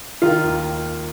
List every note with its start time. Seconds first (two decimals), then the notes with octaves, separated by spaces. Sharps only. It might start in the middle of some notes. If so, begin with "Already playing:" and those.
0.22 D#3 F4
0.43 D#2